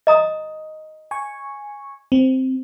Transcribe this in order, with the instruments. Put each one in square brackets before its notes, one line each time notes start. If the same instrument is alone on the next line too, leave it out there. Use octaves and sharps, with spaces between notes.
[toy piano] D#5 A#5 D#6
[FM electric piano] G#5 C#6
C4